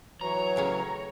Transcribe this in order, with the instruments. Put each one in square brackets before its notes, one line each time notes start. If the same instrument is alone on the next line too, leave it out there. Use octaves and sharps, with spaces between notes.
[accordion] E3 F#3 [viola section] C#5 [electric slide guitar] A#5
[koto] A2 C#3 C#4